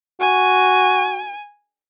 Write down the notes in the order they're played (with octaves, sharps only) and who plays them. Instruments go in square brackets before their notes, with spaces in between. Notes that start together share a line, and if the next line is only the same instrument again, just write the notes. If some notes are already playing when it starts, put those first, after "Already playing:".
[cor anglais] F#4 [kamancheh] G#5